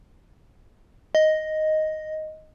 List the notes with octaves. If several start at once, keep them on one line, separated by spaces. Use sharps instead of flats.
D#5